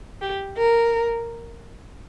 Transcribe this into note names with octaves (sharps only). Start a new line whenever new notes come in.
G4
A#4